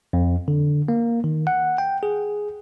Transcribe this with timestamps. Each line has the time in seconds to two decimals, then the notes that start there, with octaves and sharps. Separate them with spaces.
0.13 F2
0.48 D3
0.88 A#3
1.24 D#3
1.47 F#5
1.78 G5
2.03 G#4